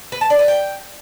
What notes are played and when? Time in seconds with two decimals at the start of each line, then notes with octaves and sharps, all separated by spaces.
0.12 B4
0.21 A5
0.30 D5
0.39 B4
0.48 G5